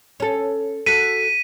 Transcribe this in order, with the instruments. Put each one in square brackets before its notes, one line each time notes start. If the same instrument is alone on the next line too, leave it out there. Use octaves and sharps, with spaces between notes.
[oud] C#4 A4
[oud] F#4 A4 [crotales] B6 D#7